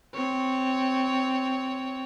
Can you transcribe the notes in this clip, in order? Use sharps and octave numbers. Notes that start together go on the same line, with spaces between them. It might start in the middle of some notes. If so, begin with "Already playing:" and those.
C4 C#5